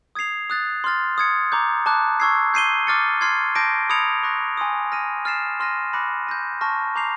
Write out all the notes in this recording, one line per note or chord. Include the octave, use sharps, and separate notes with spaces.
D#6 G#6 C7 F7
D#6 F#6 A6
C6 F6 A6
D#6 G#6 C#7
A#5 D6 G6
A5 D6 F#6
C#6 E6 G#6 C7
G6 C7 D#7 G7
D6 F6 A6 C#7
C6 F6 G#6 C7
A5 D6 G6 A#6 D7
B5 D#6 G#6 C#7 F7
C#6 F#6 A#6
G#5 C6 D#6
F6 A#6 D#7
F6 A6 C7 E7
C6 F6 A#6 D#7
B5 D6 F#6 A#6 C#7
G6 A#6 D#7
A5 C#6 F6 A#6
A#5 D6 G6 C7 F7